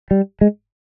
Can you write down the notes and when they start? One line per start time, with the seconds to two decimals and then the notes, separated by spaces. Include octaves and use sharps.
0.11 G3
0.41 G#3